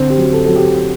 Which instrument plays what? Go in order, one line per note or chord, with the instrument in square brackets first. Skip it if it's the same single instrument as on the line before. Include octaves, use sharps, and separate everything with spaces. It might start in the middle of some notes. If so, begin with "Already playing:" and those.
Already playing: [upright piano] D3 C4
G4
F#3
A4
F#3 A4
G4